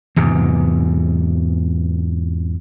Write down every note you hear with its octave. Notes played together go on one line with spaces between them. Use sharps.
E2 G#2 C3